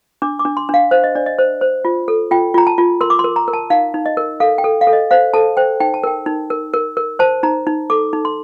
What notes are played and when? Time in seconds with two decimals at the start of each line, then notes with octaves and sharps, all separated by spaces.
0.22 D4 D6
0.39 D6
0.45 D4
0.57 C6
0.69 D4
0.74 F5
0.91 C5 F5
1.04 D#5
1.15 D4 D5
1.26 D#5
1.39 C5
1.61 C5
1.85 F4
2.08 A4
2.31 F4 G5
2.54 F4 A#5
2.67 A5
2.78 F4
3.01 A#4 C6
3.10 D6
3.19 C6
3.24 A#4
3.36 A#5
3.48 A#4
3.53 A5
3.70 D#4 F5
3.94 D#4
4.06 D#5
4.17 A#4
4.40 A4 F5
4.58 G5
4.64 A4
4.81 F5
4.87 A4
4.93 D#5
5.11 C5 F5
5.34 A4 A5
5.57 C5 G5
5.80 D#4 G5
5.94 A5
6.04 A#4 G5
6.26 D#4
6.50 A#4
6.73 A#4
6.97 A#4
7.19 C5 A5
7.43 D#4 A#5
7.67 D#4
7.90 A4 D6
8.13 D#4
8.25 C6